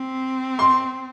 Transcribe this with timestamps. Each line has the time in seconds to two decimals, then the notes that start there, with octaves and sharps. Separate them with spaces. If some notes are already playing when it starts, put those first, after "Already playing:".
Already playing: C4
0.59 C6